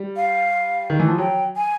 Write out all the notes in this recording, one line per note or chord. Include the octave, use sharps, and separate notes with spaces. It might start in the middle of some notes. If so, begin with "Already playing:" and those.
Already playing: G3
F5
D#3
E3
F3
F#3 G5
G#5